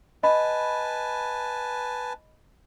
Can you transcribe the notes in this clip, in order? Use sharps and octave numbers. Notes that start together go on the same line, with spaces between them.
B4 D#5 G#5 A5 B5